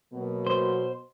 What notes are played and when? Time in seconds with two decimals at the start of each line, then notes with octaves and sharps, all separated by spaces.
0.13 B2 F#3 A#3 B3
0.47 C5